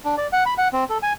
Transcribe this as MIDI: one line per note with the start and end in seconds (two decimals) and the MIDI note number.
0.05 0.15 62
0.18 0.27 74
0.33 0.44 78
0.46 0.54 83
0.58 0.68 78
0.73 0.84 60
0.90 0.98 69
1.03 1.13 80